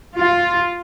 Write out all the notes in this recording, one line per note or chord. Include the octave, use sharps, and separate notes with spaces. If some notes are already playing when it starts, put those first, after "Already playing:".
F4